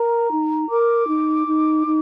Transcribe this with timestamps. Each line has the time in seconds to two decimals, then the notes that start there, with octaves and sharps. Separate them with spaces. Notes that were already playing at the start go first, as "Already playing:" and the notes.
Already playing: A#4 A#5
0.30 D#4
0.69 A#4 D6
1.08 D#4
1.47 D#4
1.86 D#4